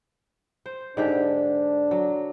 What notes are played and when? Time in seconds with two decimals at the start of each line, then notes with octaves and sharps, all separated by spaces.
0.66 C5
0.97 G#2 D3 D4 G4
1.91 F#3